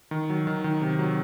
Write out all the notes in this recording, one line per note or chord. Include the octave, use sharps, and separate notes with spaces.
D#3
F#3
D#3
D#3
C3
F#3